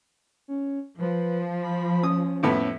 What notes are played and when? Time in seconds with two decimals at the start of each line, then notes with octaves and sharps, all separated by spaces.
0.48 C#4
0.99 F3 B4
1.62 B5
2.03 C#4 D#6
2.43 F2 A2 B3